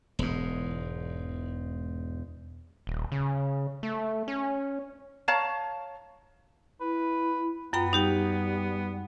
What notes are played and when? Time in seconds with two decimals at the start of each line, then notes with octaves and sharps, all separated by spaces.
0.19 E1 G#2
2.87 D#1
3.12 C#3
3.83 A3
4.28 C#4
5.28 C#5 F5 A5 A#5
6.80 E4 B4
7.73 F#2 B3 F4 G5 B5
7.93 G3 D#4 G4 G5